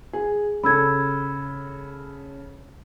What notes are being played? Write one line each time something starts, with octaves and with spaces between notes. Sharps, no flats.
G#4
C#3 A4 B5 E6 G#6